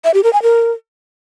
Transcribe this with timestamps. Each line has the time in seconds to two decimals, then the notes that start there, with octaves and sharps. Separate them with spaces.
0.04 E5
0.14 G4
0.23 A#4
0.33 G#5
0.43 A#4